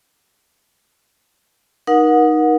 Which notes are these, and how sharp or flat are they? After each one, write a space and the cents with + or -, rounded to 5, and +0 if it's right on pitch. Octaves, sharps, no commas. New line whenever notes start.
D#4 -5 A#4 +35 F#5 -25